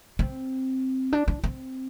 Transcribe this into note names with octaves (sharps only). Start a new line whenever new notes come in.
C4
D4
D4
C4